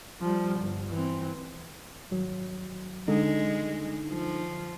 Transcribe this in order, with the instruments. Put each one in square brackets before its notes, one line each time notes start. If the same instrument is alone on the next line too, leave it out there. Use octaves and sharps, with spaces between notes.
[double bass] F3 G3
G1
E3 C4
[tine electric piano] G#1 F#3
[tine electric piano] D3 D#4 [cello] G#3
[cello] F3